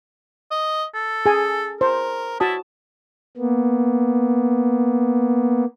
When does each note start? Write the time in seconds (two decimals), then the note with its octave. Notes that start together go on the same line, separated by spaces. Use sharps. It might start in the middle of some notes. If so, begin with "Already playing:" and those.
0.51 D#5
0.95 A4
1.26 G#4 G#5
1.81 A#4 C5
2.40 E4 F#4 A5 D#6
3.37 A#3 B3